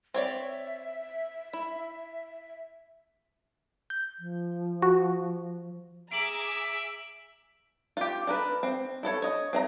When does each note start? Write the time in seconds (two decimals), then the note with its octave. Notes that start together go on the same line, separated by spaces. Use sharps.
0.14 C4 C#5 D5 E5
1.53 E4
3.90 G6
4.19 F3
4.82 F#4
6.12 G#4 E5 A#5 D6 D7 F#7
7.97 F4 G4
8.27 D4 A#4 B4
8.63 C4
9.03 E4 A4 C#5
9.22 C#5 D#5
9.53 C4 D#5 A#5